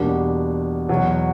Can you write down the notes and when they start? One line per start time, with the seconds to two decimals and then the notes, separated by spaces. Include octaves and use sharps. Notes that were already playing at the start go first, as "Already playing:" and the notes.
Already playing: E2 B2 G3 A#3 D4
0.89 E2 B2 F#3